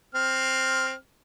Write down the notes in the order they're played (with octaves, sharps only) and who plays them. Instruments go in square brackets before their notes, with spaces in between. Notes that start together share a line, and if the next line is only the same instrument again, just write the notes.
[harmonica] C4 F6